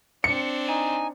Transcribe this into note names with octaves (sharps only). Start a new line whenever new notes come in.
C4 D4 C#7
D#4 G#5